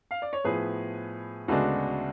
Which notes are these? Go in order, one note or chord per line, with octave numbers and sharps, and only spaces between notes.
F5
D5
C#5
A2 F3 B3 G#4 B4
D2 C#3 G#3 B3 D4 F#4 A4